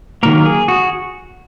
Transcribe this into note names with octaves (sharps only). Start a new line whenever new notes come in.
D#3 F#3 A#3 A#4
G#4
F#4